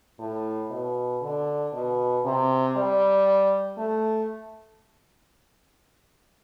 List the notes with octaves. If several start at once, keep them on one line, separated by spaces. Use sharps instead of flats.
A2
B2
D3
B2
C3
G3
A3